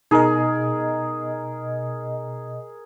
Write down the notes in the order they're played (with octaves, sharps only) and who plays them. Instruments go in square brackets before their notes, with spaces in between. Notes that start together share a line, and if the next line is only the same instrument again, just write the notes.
[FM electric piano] B2 D#5 [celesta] D#4 [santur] G#4 A#4